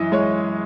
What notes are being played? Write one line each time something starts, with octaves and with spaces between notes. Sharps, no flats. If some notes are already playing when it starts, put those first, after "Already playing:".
Already playing: F#2 E3 D#5 E5
G#3 C#5